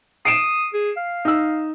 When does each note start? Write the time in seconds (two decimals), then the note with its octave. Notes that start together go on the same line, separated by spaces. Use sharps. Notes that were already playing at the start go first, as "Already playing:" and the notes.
0.25 D#6 C7 D7 E7
0.73 G#4
0.97 F5
1.25 D#4 E6